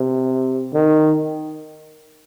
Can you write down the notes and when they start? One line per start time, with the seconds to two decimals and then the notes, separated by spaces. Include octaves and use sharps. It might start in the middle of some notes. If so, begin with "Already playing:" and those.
Already playing: C3
0.73 D#3